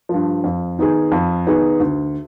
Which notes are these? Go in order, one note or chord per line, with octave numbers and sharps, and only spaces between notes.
G2 F3
F2
D#3 B3 D#4 G#4
F2
D#3 B3 D#4 G#4
D2